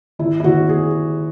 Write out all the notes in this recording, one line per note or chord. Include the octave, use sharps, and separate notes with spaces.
G#1 E4
E4
G#1 F#4
G#4